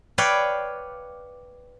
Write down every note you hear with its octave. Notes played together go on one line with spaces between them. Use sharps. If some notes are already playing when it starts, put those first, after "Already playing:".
B4 C#5 D5 F5 G5